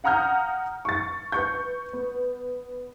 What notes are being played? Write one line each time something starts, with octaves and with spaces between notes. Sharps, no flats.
F5 F#5 A#5 D#6 F6 G6
C#6 A6
B4 C#6 G6
B3